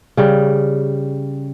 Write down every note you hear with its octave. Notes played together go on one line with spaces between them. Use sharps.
C#3 G3